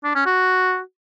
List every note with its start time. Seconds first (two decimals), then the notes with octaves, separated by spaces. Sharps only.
0.04 D4
0.15 C#4
0.26 F#4